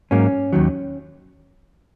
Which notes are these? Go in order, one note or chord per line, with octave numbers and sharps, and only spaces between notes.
G#2 F#3 A#3 C#4
D#2 D#3 F#3